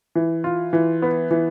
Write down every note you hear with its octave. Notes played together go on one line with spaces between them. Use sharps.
E3
F4
E3
B3
E3